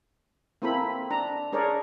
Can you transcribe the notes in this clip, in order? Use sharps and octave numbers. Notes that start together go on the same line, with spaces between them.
A#3 C4 E4 A4 B5
D4 A#5
D4 G#4 A#4 C#5 D5